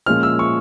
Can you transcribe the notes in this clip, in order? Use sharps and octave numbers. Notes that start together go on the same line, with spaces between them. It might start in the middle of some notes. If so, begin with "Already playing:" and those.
A#2 F3 G#3 C#4 F6
E6
C#6